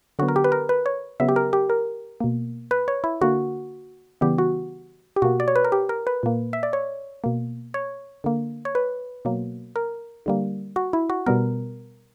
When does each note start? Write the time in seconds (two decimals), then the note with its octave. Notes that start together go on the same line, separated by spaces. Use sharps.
0.19 D3 F#3 B3 F#4
0.28 A#4
0.36 G4
0.44 B4
0.52 A#4
0.69 B4
0.86 C#5
1.20 C#3 F#3 B3 E5
1.29 G4
1.36 A#4
1.53 G4
1.70 A#4
2.20 B2 A#3
2.71 B4
2.88 C#5
3.04 E4
3.21 D3 A#3 F#4
4.21 C#3 E3 G3 B3 G4
4.38 F#4
5.16 G4
5.22 B2 A#3 F#4
5.40 D5
5.48 C#5
5.56 B4
5.64 A#4
5.72 G4
5.89 A#4
6.07 B4
6.23 A#2 A#3
6.53 E5
6.63 D5
6.73 C#5
7.24 B2 A#3
7.74 C#5
8.24 D3 A#3
8.65 C#5
8.75 B4
9.25 B2 F#3 A#3
9.76 A#4
10.26 D3 G3 A#3
10.76 F#4
10.93 E4
11.10 F#4
11.26 B2 G3 B3 A#4